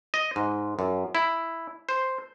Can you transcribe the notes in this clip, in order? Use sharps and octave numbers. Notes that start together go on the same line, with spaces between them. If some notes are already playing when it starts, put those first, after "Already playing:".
D#5
G#2
F#2
E4
C5